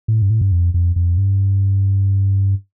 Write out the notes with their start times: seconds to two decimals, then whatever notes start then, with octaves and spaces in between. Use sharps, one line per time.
0.08 A2
0.22 G2
0.30 A2
0.41 G2
0.52 F2
0.74 F2
0.96 F2
1.18 G2